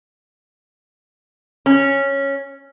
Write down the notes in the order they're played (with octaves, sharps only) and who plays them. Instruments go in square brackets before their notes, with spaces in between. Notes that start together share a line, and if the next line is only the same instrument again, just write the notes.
[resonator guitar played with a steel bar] C#4